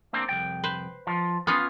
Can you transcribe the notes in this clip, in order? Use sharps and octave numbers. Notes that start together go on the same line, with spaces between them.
A#3 C4 D4
C2 F2 G5
B4 C5
F3
B3 C#4 F4 G#4